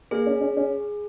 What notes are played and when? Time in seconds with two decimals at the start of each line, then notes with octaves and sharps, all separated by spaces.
0.11 A#3 G#4
0.26 C#4
0.41 C#4
0.57 C#4